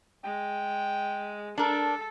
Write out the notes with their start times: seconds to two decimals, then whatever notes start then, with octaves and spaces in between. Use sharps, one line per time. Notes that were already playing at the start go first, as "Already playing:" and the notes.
0.24 G#3 G5
1.58 D4 A4 A#4